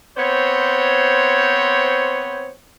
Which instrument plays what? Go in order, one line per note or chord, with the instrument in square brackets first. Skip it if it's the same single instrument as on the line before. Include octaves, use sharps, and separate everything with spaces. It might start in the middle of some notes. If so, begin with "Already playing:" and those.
[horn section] B3 C4 C5 C#5